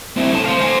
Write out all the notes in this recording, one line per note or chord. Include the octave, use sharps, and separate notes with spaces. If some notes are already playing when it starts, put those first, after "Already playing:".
C4 E4
A2 A5
C5 F5
C5 G#5